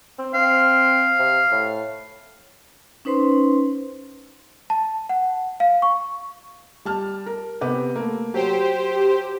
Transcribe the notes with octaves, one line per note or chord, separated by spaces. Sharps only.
C4
C4 F5
C3
A2
C#4 D#4 B4 C5 C6
A5
F#5
F5
C#6
G3 A5 F6
A#4
C3 B3 G4
A3 A#3
F#3 G4 C5